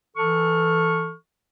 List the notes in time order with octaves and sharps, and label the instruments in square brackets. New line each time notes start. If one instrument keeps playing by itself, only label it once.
[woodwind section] E3 A4 C#6 F6